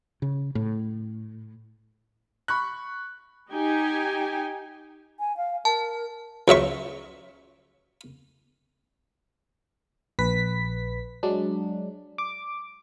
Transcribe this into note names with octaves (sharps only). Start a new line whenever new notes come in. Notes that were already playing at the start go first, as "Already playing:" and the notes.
C#3
A2
B5 C#6 F#6
D#4 G4 G5 G#5
G#5
F5
A#4 A5
C#2 F#3 E5 C#6
A#1 B4 B6
F#3 G#3 D4
D6